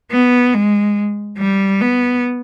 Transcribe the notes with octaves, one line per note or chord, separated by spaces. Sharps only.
B3
G#3
G3
B3